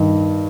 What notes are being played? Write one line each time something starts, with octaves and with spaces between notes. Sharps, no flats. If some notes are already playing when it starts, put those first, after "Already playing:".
Already playing: G2 D#3